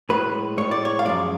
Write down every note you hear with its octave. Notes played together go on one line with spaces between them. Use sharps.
A2 G#3 B4
A2 G#3 C#5
D5
C#5
F5
F#2 F3 G#3 D5